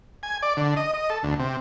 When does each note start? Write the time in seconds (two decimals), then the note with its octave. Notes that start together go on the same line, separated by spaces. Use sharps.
0.23 G#5
0.42 D5
0.57 D3
0.77 D#5
0.94 D#5
1.10 A4
1.23 D2
1.40 C3